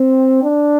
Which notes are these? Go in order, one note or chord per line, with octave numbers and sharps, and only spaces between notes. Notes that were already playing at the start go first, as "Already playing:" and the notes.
Already playing: C4
D4